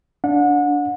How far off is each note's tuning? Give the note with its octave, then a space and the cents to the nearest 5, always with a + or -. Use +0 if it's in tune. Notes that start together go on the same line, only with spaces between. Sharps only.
D4 -15 F#5 -35